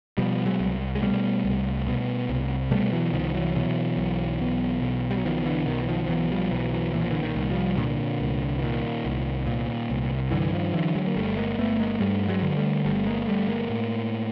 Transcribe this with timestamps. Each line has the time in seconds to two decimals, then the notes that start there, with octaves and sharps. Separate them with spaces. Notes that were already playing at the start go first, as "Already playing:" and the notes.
0.18 B2 F3 G3
0.46 F#3 G#3
0.60 C2
0.95 G#3
1.02 B2 G3 A3
1.45 C2
1.87 B2
2.29 C2
2.71 B2 G3 A3
2.93 E3 F#3
3.13 C2 D#3 F3
3.34 E3 F#3
3.55 B2 E3 F#3
3.98 B1
4.41 B2
4.82 B1
5.10 G3
5.17 F#3
5.25 B2 D#3 F3
5.46 D3 E3
5.66 B1 D#3
5.83 E3
5.89 D#3 F3
6.05 F3
6.09 B2 E3 F#3
6.31 F3 G3
6.51 B1 E3 F#3
6.73 E3 F#3
6.93 A#2 E3
7.02 F3
7.10 D3 E3
7.23 D#3
7.36 C2
7.50 F3 G3
7.78 A#2 D3
8.20 C2
8.58 E3
8.62 A#2 D#3
9.05 C2
9.47 A#2
9.90 C2
10.31 G2 D3 E3
10.53 D#3 F3
10.74 D3 E3 F#3
10.95 F#3 G#3
11.07 A#3
11.16 G1 G3 A3
11.37 G#3 A#3
11.58 G1 A3 B3
11.79 G#3 A#3
12.00 G2 G3 A3
12.29 F#3 G#3
12.42 D3
12.56 G3 A3
12.85 G1 G3 A3
13.06 G#3 A#3
13.27 G1 G3 A3
13.48 G#3 A#3
13.70 A2